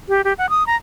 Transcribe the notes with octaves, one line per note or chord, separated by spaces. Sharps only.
G4
G4
F#5
D#6
A#5